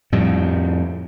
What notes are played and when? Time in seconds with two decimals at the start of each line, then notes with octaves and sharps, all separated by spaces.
0.12 F2 A2 G3